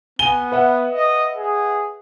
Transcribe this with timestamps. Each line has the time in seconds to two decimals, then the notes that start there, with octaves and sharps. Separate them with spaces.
0.19 B3 G#5 D#7 G7
0.52 B4 E5 F#5
0.91 D#5
1.36 G#4